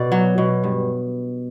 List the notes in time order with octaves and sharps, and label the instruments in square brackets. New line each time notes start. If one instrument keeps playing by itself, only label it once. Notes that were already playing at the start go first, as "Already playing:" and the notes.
Already playing: [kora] B2 D5
F#3
B2
G2